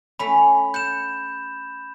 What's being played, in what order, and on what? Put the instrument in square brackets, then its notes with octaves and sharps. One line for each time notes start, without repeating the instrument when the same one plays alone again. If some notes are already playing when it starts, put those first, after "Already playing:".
[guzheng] A3 C#4 [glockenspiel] B5
[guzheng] F#5 [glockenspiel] G6 E7